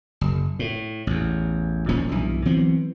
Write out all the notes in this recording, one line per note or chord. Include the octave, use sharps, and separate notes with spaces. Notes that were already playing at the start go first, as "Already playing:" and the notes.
F#1
A2
A1 E2
D#1 A#2 F3 C#4
B1 G2 E3
E3 F#3 B3 C4